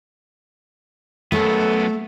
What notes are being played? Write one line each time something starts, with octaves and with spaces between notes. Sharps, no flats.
F#2 A3 B3 A4